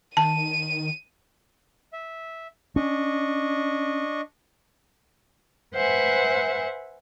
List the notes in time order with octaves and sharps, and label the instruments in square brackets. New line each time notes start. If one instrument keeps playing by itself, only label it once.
[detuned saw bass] D#3 [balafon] A5 [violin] D#7
[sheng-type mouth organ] E5
[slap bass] C#4 [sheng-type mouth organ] D4 D#5 C#6
[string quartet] B4 C5 E5 F#5 G#5